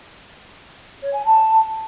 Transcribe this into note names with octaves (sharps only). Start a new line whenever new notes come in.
C#5
G#5
A5